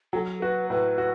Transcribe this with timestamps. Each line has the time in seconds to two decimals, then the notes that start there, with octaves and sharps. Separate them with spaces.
0.13 F#3 A4
0.41 F#4 B4
0.70 A2 B4
0.98 F#4